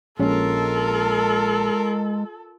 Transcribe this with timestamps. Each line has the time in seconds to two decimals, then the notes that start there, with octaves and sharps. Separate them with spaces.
0.19 A#1 G#3 C#4 F4 A4 A#4